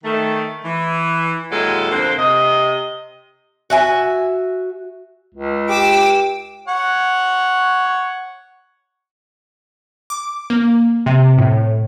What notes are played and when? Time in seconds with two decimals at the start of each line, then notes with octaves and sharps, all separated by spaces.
0.04 D#3 A3
0.64 E3
1.51 D#2 A#2 F#3 G#3 E4 A4
1.91 F2 D3 A#3 C4 C5
2.17 C3 D#5
3.70 F#4 E5 G#5
5.35 C#2
5.69 G4 D6 E6
6.68 C#5 F#5
10.10 D6
10.50 A#3
11.06 C3
11.38 A2